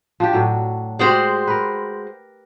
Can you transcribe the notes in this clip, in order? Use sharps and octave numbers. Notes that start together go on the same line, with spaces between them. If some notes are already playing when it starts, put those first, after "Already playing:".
F3 D4 G4
A2 F#3
G#3 F#4 G4 C5 D5
A#4 B4